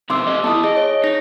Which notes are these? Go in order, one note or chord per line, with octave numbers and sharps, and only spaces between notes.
B2 D#3 C4 C6 D6 E6
G4 A4 D#5
B3 D#4 E4 A5 D#6
G#4 D#5
C#5
D#4 A#6